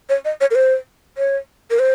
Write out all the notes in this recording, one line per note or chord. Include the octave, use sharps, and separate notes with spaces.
C#5
D#5
C#5
A#4
C5
C#5
A#4
C5